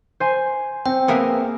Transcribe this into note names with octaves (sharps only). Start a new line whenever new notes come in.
C5 G#5
C4 G5
A#3 B3 G#4 A#4 E5